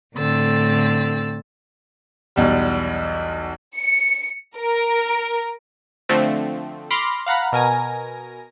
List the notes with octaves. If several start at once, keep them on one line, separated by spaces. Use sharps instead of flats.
A2 D3 C4 E6 A6
B1 E2 G3
C#7
A#4
D3 F3 A3 C4
B5 C6 D6 F6 A#6
F5 F#5 A#5 B5
B2 A#4 G#5 A#6